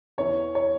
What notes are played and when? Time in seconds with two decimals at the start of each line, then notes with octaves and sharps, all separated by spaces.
0.18 E2 E3 C#5
0.55 C#5